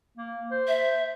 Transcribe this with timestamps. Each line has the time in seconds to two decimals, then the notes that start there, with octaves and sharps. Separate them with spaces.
0.17 A#3
0.51 C5
0.68 E5